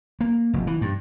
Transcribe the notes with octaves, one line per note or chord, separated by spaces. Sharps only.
A#3
F1
E3
G2